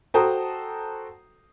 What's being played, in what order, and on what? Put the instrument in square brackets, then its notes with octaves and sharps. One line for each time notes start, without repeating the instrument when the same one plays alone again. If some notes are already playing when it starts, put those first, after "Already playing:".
[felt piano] F#4 A4 C5 G5 A#5 D#6